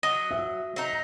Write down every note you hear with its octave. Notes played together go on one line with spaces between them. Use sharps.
F#3 D#5
E5
F#3 D#4